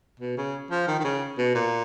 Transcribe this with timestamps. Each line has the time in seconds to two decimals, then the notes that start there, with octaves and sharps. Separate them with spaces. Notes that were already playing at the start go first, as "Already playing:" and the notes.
0.20 B2
0.37 C#3
0.71 F3
0.87 D#3
0.99 D#3
1.04 C#3
1.38 B2
1.55 A#2